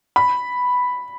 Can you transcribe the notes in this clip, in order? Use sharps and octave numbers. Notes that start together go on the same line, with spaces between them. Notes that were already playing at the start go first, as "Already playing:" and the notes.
B5